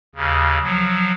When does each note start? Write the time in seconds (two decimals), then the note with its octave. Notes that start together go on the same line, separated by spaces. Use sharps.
0.15 D#2 C#3
0.63 F3 F#3